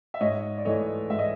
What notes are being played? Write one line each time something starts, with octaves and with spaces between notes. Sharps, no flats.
E5
G#2 C#5 D#5
D5
E3 A3 C#5 D#5
G#2 E5
D#5